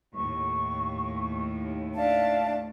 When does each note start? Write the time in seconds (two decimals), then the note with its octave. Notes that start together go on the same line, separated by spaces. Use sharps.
0.14 D#2 A2 C#6
1.95 D4 E5 F5 A5